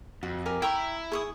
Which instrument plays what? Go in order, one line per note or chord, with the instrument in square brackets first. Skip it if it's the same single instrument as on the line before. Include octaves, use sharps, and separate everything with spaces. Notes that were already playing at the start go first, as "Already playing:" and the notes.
[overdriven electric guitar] F2 [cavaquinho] F#4
[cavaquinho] G4 A#4 G#5
[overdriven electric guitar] E4 E5 [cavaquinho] G5 A#5 C#6
[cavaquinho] G#4 C#6 D#6